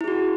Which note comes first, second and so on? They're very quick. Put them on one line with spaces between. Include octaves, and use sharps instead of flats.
E4 G#4 F#4